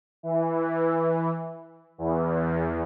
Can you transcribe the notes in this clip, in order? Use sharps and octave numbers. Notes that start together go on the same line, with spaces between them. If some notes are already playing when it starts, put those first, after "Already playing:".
E3
E2